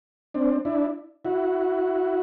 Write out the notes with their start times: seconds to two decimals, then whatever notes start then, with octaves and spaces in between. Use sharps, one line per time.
0.34 C4 D4
0.65 D4 E4
1.25 E4 F#4